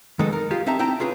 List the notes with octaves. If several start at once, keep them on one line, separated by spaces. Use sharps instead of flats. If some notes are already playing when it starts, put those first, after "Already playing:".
D#3 G#3 B3 D#4 A4
A#4
F4 G4 G#4
C4 D#4 E5 A5 A#5
C4 E4 G5 A5 A#5
C#4 F4 G#4 B4 C#5